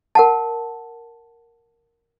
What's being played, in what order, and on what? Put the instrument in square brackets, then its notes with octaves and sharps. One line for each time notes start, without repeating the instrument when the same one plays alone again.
[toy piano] A#4 F#5 A5